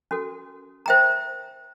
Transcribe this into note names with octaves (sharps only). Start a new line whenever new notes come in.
C#4 F#4 A4
C5 E5 G5 A#5